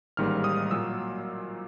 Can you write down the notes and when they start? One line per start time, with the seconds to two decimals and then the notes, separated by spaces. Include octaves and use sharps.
0.17 A1 G#2 D#3 G3 A#3 F6
0.44 D#6
0.71 A#2 F#3 E6